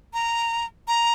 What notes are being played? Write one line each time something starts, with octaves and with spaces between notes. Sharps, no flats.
A#5
A#5